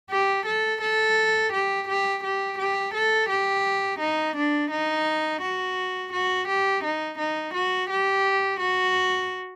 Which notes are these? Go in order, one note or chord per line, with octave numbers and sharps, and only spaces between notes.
G4
A4
A4
G4
G4
G4
G4
A4
G4
D#4
D4
D#4
F#4
F#4
G4
D#4
D#4
F#4
G4
F#4